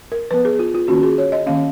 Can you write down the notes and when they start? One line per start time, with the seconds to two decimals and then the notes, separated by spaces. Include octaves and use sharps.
0.12 A#4
0.31 F3 B3 B4
0.45 G#4
0.59 F4
0.74 F4
0.88 D#3 A#3 C#4 F#4
1.03 G#4
1.18 C#5
1.32 D#5
1.46 D#3 A#3 C#4 F5